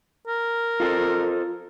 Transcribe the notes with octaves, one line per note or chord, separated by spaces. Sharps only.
A#4
F4 A4 C5